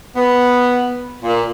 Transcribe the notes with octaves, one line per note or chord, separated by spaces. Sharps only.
B3
A#2